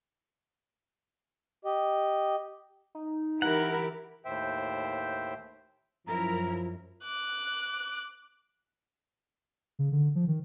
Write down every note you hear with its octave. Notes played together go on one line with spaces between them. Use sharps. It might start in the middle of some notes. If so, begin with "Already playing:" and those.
G4 D#5
D#4
E3 E4 G4 A#4 F#5
D#2 A2 C5 E5 G5
F#2 F3 E4 A#4 A#5
D6 F#6
C#3
D3
F3
D#3